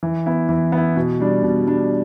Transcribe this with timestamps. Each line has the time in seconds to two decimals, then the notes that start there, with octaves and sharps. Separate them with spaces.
0.03 E3
0.26 B3 E4
0.49 E3
0.72 B3 E4
0.96 B2
1.20 G3 D4
1.43 B2
1.67 G3 D4